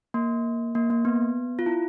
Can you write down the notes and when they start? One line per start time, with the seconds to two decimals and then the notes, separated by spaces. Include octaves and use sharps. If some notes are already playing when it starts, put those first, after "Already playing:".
0.14 A#3
0.75 A#3
0.90 A#3
1.05 B3
1.59 F4
1.66 E4